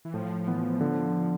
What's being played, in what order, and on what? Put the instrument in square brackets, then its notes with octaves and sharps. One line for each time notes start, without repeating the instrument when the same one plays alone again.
[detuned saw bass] E3
[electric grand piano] A2 [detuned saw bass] F3
[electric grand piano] E3 B3
D3